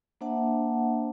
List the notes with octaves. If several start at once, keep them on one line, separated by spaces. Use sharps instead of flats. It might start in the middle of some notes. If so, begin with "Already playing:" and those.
A#3 D4 C5 E5 F#5 A5